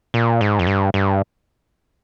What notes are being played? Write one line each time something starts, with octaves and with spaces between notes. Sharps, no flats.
A#2
G#2
F2
G2
G2